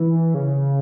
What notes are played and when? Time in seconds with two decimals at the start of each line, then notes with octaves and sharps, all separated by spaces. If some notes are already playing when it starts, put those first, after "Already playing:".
Already playing: E3
0.34 C#3